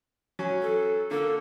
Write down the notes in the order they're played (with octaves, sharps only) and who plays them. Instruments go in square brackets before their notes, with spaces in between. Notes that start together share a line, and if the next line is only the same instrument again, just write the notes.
[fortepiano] F#3 C#4 G#5
[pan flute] A4
[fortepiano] D3 A#3 [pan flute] A4